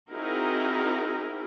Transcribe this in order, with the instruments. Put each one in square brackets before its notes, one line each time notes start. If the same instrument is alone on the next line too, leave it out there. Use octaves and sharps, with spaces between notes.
[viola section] C4 D#4 E4 F#4 G#4 A#4